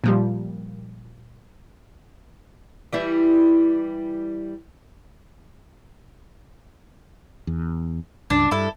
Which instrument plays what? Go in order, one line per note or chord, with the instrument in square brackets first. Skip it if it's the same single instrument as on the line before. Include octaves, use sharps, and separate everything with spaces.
[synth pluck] A#2 F3 G3
[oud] E3 G3 E4
[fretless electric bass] E2
[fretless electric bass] C#2 G2 [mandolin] D4 A5
[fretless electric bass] G2 [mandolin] E4 A4